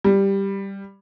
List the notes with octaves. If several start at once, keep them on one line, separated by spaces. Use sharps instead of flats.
G3